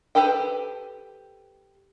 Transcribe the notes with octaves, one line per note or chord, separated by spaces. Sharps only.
G4 A4 B4 C5 G5